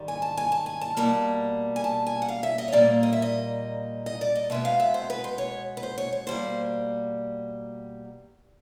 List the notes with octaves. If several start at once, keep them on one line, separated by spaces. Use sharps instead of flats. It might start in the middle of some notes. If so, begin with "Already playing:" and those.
Already playing: G#2 D#3 G3
G#5
A5
G#5
A5
G#5
A5
B2 G3 A#3
G#5
A5
G#5
F#5
F5
E5
D#5
C#5
A#2 G3 A#3 D5
D#5
E5
D#5
D#5
D5
D#5
B2 G#3 B3 E5
F5
E5
C5
B4
C5
C#5
B4
C5
C#5
C#5
B2 G3 A#3 C5